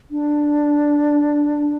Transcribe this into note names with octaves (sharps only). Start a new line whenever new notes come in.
D4